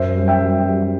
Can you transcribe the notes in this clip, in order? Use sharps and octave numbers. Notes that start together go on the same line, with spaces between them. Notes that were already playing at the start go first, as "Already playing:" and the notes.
Already playing: F#2 C5 E5
G3
E5 G5
G3
G3